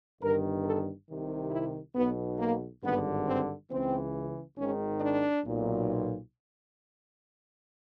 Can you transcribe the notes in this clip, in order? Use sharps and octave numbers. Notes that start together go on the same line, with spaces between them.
G1 G2 D#3 A#4
A4
C2 C3 D#3
E4
B1 B2 B3
A#3
G#1 G2 D3 B3
C4
C#2 C#3 E3 C4
G#1 G#2 D#3 C#4
D4
B1 A#2